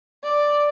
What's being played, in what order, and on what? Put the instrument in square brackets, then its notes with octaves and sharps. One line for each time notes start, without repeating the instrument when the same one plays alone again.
[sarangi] D5